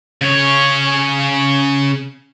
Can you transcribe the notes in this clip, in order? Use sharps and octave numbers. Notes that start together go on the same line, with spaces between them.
C#3 C#5